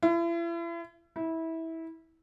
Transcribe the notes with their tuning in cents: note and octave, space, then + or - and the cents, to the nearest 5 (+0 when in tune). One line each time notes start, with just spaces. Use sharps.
E4 +40
E4 -20